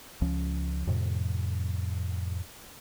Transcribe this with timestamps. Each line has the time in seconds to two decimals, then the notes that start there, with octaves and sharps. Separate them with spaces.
0.21 C#2 F3 C#4
0.87 F2 A2 C3